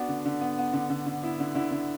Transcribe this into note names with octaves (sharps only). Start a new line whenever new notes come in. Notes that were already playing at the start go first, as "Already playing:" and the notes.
Already playing: B3 D4 F#4
D3
D3
B3
B3
D3
D3
D3
B3 E4
D3
D3 E4
D3